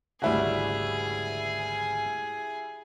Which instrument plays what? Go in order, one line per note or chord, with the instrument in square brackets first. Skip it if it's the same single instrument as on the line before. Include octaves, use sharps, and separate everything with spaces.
[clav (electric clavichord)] G#1 D2 C#3 [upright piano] G3 E4 F#4 [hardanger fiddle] G#4